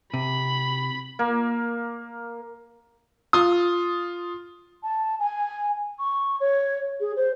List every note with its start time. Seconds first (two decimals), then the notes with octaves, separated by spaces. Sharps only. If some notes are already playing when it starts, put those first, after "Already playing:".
0.14 C3 B5
1.19 A#3
3.33 F4 D#6
4.83 A5
5.19 G#5
5.99 C#6
6.40 C#5
7.00 G#4
7.16 C5